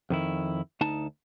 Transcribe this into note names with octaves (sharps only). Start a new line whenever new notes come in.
F2 D#3 E4
D2 D#4 A5